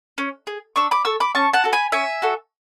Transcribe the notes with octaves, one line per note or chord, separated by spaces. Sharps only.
C#4
G#4
D4 C#6 E6
B5 D6
A4 C#6 E6
B5 D6
C#4 A5 C#6
F#5 A5
F#4 A4
G#5 B5
C#4 E5 G#5
F#4 A4